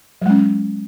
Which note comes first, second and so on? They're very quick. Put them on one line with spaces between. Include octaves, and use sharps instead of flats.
F#3 G#3 C#4